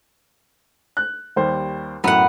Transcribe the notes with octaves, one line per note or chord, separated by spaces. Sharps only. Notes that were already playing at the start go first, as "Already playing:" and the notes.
F#6
D#2 G3 C5
F#2 A2 B3 F#5